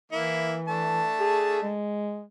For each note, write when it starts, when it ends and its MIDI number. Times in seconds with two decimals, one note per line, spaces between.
0.12 1.09 52
0.12 0.58 58
0.12 0.58 64
0.68 1.73 57
0.68 1.73 62
0.68 1.73 81
1.20 1.59 68
1.63 2.24 56